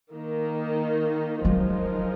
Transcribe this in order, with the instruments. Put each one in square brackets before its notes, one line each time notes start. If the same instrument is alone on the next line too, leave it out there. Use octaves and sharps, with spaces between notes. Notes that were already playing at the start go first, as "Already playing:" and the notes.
[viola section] D#3 A#3 D#4
[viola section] F3 G#3 D#4 A#4 [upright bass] F#3